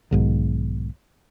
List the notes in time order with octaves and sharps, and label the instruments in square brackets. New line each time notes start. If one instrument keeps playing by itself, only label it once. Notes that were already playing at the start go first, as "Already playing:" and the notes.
[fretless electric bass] B1 G#2 D#3